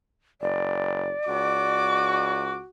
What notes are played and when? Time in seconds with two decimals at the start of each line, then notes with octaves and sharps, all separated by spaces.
0.41 F#1 D5
1.28 C#2 F#4 D6